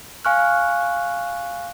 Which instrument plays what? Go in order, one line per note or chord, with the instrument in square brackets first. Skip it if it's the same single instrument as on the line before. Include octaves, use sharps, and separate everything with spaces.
[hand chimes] F5 G#5 C#6 F6 F#6